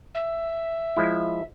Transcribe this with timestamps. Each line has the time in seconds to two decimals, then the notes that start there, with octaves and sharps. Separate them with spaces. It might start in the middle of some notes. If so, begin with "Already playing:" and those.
0.14 E5
0.97 F3 G#3 E4